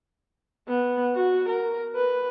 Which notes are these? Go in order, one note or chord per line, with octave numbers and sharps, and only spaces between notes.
B3
F#4
A#4
B4